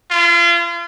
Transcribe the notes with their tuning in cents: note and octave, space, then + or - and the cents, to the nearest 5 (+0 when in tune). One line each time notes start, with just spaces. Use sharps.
F4 -35